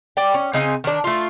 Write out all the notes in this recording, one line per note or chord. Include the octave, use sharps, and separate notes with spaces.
D5 G5
C#4
C#3 C4 D#4 G#5
D#3 D4
A3 F4